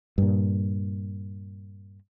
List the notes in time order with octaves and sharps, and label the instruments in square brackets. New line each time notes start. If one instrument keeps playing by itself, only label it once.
[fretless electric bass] G2 A#2